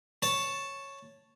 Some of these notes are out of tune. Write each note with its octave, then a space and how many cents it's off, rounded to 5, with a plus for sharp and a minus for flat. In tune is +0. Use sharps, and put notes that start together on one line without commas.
C#5 -5 A5 +0